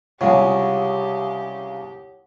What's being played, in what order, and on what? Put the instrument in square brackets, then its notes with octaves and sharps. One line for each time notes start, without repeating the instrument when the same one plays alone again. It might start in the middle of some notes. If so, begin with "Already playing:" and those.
[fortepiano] C2 G#3 F4 [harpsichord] C#3 [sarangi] G4 [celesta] C#5 F#5